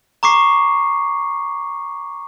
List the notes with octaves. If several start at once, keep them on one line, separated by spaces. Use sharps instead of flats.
A#5 C#6 D6 C7